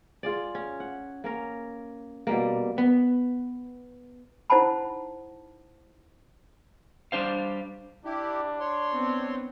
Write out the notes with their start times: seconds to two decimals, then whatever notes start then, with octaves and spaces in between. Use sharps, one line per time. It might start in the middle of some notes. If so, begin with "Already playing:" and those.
0.23 F4 G#4 D5
0.55 C#4
0.80 F#5
1.24 A#3 C#4 A#4
2.27 B2 G3 A#3
2.78 B3
4.50 D#4 E4 C5 F#5 A5 B5
7.12 G3 D4 C5 F5
8.05 D4 E4 G4
8.60 C#5 C6
8.93 B3 C4